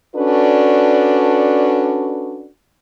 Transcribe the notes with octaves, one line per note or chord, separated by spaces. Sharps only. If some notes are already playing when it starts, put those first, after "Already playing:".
C#4 D4 F#4 A4 B4 D5